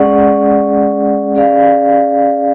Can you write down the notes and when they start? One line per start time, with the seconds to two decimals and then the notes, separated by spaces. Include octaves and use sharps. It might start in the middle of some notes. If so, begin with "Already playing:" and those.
Already playing: G#3 C#4 G#4 D5 F#5
1.35 C#4 G#4 D5 F5